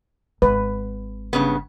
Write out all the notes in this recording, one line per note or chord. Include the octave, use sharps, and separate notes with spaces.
G#1 B4
G2 C#3 B3